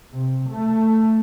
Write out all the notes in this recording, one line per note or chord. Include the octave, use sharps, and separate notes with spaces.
C3
A3